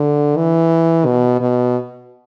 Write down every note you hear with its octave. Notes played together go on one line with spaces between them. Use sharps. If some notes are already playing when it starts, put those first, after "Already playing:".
Already playing: D3
E3
B2
B2